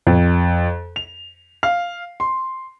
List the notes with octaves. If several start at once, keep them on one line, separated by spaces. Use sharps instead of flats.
F2
F7
F5
C6